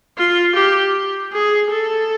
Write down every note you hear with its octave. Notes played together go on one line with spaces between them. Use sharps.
F4
G4
G#4
A4